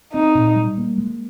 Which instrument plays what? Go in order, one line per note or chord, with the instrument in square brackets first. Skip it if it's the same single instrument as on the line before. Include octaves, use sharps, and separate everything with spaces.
[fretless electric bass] C4 [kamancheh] D#4
[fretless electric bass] A#2
G3
A#3
G#3